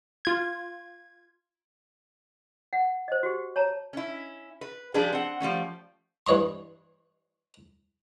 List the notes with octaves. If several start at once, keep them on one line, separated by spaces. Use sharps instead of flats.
F4 G#6
F#5
C5 D#5
F#4 G4
C#5 A5 A#5
C#4 E4
B4
F3 G3 D4 G4 G#4 B4
C4 F#5
F3 G3 A3 C#4
G2 E3 C#5 D#5 C6